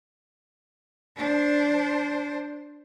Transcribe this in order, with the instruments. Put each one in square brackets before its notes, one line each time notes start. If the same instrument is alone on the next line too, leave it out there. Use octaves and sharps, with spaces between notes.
[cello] D4 C5